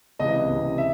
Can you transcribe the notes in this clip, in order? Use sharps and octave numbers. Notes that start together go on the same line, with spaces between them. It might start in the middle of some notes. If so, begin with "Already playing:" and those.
C#2 C3 E3 D#5
C#2 C3 E3
E5